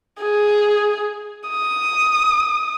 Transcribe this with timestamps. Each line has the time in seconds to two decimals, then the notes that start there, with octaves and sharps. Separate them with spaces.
0.22 G#4
1.50 D#6